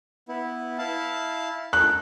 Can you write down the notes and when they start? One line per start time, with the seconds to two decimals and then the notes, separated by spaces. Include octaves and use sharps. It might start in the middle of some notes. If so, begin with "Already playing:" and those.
0.28 B3 E4
0.78 E4 F5 A5
1.73 A4 A#4 F#6